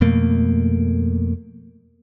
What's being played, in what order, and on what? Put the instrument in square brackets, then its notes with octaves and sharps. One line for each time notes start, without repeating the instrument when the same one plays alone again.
[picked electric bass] F2 B2 A3 A#3